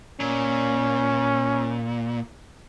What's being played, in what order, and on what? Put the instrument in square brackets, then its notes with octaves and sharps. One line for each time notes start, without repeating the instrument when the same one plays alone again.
[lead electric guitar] A#2 [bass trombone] C#4